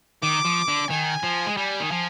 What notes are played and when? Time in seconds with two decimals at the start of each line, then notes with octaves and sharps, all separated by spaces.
0.22 D#3 D6
0.45 F3
0.68 D3
0.90 D#3 G#5
1.24 F3
1.47 G#3
1.57 G3 G#5
1.80 D#3
1.92 F3